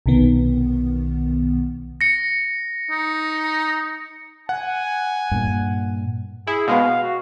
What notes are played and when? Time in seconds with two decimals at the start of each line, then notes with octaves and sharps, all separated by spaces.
0.06 B1 C3 D#3 B3
2.01 A#6 C#7
2.91 D#4
4.49 F#5 G#5
5.31 G2 A#2
6.47 E4 G#4
6.68 B2 G#3 B3 F5
7.02 F#4